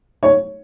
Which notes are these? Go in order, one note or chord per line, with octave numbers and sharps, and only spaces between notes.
C#5